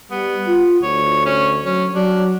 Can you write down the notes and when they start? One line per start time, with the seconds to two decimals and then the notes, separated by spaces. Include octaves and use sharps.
0.11 G3 B3
0.47 F4
0.83 D2 C#5
1.26 C#4
1.66 F#3 C#4
1.95 F#3 D4